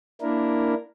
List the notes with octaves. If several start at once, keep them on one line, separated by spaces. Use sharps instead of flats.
A#3 D4 E4 A#4